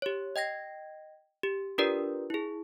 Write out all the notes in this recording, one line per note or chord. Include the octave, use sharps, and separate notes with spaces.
G4 C#5
D#5 G5 G#6 A#6
G4
D4 F4 G4 A#4 B4 D5
E4 G#4